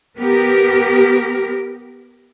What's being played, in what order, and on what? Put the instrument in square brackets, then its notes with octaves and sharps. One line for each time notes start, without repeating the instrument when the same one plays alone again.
[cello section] B3 G4 A#4